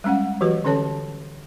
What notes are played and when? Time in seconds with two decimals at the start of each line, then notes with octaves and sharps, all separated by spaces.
0.04 G3 G#3 C#4 F5 F#5
0.41 E3 F#3 F#4 G4 B4
0.65 D3 C#4 A4 C#5 A5